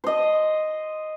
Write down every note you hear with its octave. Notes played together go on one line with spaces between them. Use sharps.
C5 D#5